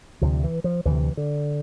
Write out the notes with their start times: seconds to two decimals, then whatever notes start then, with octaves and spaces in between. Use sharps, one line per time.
0.21 D2 C3 F3
0.44 E3
0.64 F3
0.85 D2 C3 E3
1.17 D3